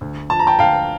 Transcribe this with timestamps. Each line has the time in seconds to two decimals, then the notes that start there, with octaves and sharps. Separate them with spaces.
0.01 D2
0.30 F3 A5
0.39 A#5
0.47 G5 A5
0.59 D2 F5 G5